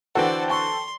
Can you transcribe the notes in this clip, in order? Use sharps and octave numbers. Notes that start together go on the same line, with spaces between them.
D3 E3 F#4 A4 C5 D5 G5
A5 C6 C#6